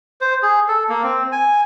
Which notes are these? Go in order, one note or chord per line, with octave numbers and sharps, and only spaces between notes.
C5
G#4
A4
A#3
C4
G#5